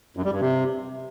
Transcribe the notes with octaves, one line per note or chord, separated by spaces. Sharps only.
F#2
G3
G2
C3